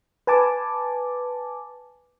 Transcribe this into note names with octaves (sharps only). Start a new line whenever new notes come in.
B4 G#5 A5 D6